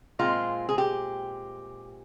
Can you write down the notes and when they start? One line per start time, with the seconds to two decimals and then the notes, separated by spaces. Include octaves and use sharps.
0.19 A#2 G#3 C4 F4
0.69 G#4
0.78 G4